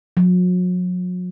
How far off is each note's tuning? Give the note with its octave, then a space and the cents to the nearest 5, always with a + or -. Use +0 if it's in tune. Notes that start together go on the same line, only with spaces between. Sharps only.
F#3 -40